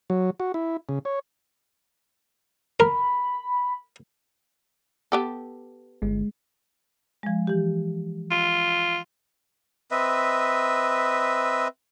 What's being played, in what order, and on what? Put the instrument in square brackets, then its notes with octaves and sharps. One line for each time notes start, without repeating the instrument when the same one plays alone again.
[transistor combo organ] F#3
F#4
E4
C#3
C#5
[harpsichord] A#4 [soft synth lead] B5
[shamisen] B3 G4 A4
[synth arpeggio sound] G1 [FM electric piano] G#3
[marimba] F3 G#3
E3 G4
[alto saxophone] F4
[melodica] C4 B4 D#5 E5